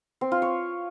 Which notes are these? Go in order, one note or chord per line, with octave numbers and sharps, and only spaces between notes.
C4
F4
C#5